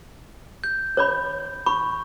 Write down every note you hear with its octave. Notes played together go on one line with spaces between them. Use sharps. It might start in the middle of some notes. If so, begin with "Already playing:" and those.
G6
C#5 D5 B5
B5 C#6